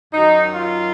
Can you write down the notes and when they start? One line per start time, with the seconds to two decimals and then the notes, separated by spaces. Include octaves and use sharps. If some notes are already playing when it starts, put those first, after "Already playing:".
0.14 F#2 D#3 F#3 D#4
0.55 F4